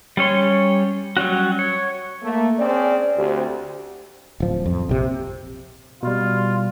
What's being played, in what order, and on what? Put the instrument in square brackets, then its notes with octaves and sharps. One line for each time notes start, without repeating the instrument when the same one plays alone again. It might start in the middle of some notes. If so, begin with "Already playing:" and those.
[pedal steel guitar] G3 C#4 C#5 C6
F#3 G3 C#4 F#4
C#5
[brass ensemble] A3 A#3
C4 C#4 G#4 D5
D2 C4 G4
[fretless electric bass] D1 F3
F2
A#1 C3
[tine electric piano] B2 G3 [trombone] F4